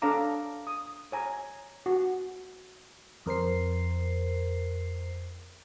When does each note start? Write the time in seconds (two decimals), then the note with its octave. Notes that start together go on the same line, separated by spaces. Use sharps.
0.02 D4 A4 C#5 F5 A#5 D6
0.67 D#6
1.12 C#5 G#5 A#5
1.86 F#4
3.26 F2 A#4 C5 C7